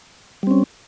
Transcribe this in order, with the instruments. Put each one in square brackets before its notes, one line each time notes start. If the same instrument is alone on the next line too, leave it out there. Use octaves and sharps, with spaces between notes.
[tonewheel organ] G3
C4
C#4